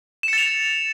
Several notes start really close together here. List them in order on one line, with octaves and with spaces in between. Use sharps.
E7 C#7 A6 F7